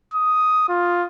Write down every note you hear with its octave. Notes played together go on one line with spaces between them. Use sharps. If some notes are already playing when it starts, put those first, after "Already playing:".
D#6
F4